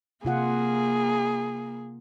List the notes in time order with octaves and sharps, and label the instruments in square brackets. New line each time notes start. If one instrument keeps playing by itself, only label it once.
[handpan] C3 F4 F#5 [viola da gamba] A#3 [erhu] G#4